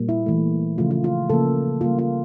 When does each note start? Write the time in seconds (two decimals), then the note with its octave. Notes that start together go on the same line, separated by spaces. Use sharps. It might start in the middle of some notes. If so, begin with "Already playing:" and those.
Already playing: A#2 G3 A#3
0.09 E4
0.26 E3 A3
0.78 C#3 F3 A3 F4
0.91 F4
1.04 F4
1.29 C#3 F3 A#3 A4
1.81 C#3 G3 A#3 F4
1.99 F4